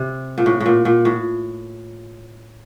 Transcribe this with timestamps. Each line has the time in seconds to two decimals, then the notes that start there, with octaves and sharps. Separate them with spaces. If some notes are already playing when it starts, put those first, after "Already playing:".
Already playing: C3
0.38 A#2
0.46 A2
0.60 A2
0.66 A#2
0.85 A#2
1.05 A2